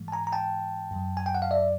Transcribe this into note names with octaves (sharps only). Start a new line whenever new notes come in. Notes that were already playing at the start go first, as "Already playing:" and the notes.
Already playing: G#2 E3 G#3
A5
G#5 A#5
A#5
G5 A5
F#2 D#3 F#3
G#5
G5
F#5
F5
D5 E5